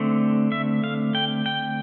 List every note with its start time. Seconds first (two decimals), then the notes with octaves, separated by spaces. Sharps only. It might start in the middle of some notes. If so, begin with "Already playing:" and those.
Already playing: D3 A3 C4
0.52 E5
0.84 F5
1.15 G5
1.46 G5